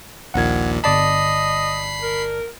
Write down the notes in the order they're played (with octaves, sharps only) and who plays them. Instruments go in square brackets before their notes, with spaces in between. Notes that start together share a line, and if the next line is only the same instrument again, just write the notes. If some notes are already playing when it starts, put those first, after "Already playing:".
[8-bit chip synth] A#1 D#2 A#2 [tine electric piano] F#5 G#6
[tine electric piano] G1 D5 A5 [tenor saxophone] D#5 [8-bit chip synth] B5 C7
[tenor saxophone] A#4